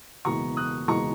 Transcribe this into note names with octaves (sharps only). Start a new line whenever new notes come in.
F#1 E2 B2 G#3 B3 A#5 C#6
D#6 F#6
F#1 E2 B2 G#3 B3 A#5 C#6